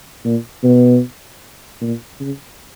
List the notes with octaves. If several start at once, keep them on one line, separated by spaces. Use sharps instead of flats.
A#2
B2
A#2
C#3